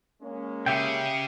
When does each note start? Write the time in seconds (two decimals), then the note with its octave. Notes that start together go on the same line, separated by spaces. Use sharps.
0.23 G#3 A#3 C#4
0.66 C#3 G4 G#4 E5 G5